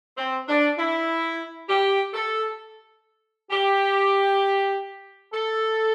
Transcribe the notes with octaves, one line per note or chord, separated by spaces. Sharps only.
C4
D4
E4
G4
A4
G4
A4